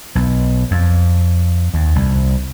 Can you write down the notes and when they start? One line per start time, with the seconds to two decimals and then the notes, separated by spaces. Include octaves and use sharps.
0.15 B1
0.71 F2
1.74 D#2
1.96 C2